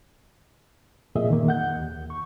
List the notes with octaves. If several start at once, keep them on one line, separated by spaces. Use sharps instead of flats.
F2 A#2 G#4 D#5 E5
D#3 A#3
F#5 G6
D#2
C#6